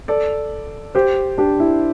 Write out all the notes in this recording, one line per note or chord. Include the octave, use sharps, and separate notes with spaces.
A4 D5
G4 C5
D4 G4
E4